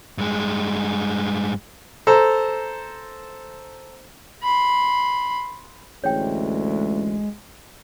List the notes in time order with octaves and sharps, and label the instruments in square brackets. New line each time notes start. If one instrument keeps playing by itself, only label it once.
[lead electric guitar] G2 G#3
[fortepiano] A4 C5 A#5
[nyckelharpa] B5 C6
[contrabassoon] A1 [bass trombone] D2 [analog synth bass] G#3 [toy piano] C#5 G5